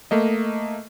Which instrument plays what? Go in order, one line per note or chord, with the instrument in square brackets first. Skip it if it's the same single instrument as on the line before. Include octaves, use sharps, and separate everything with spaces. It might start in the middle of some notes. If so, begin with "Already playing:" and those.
[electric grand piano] A3 A#3 D#5